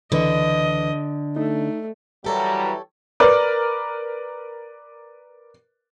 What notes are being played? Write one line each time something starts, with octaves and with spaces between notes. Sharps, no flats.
C#2 D3 E3 B4 D#5
A3 D#4
E3 F#3 G3 G4 A4 A#4 C#5 A#5
A#4 B4 D5